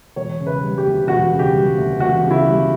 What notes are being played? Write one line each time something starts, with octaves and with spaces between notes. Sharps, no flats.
E1 C#5
C#3
B4
G3
G4
D2
E1 F#4
C#3
G4
G3
D2
E1 F#4
C#3
E4
G3